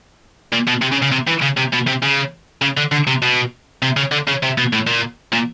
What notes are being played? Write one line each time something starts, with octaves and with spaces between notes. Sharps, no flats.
A#2
B2
C3
C#3
C#3
C3
E3
C#3
C3
B2
C3
C#3
C#3
D3
D3
C3
B2
C3
C#3
D3
C#3
C3
B2
A2
A#2
A#2